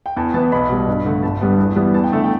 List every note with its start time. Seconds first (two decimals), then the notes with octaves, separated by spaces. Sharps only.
0.06 G5
0.16 E2 A5
0.34 E3 B3 A5
0.52 B1 B5
0.69 B2 G3
0.88 G2
1.05 D3 A3
1.23 G1 A5
1.41 G2 G3 B3
1.59 E2
1.76 E3 G3 B3
1.94 E2 A5
2.04 G5
2.12 D3 A3 E5
2.24 G5